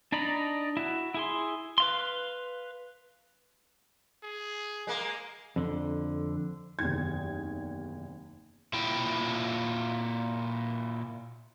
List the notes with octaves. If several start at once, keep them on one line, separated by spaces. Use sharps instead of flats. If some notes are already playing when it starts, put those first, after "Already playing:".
D4 D#4 D5 A#5 B5
E4 F#4
E4 G#4 C6
B4 F5 C6
G#4
G#3 A#3
F2 D3
F#1 E2 C3 D#3 G#6
A#2 E4 G5